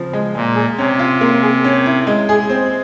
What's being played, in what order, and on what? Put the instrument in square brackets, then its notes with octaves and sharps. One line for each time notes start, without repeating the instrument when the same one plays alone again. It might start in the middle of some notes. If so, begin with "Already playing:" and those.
Already playing: [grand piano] C#3 F3 C4
G#3
[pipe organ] A#2 [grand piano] G#3
[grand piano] G#4
[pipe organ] C3 [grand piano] C#4
[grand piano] F4
A#3
G#4
C#4
E4
G#3
G#4
C4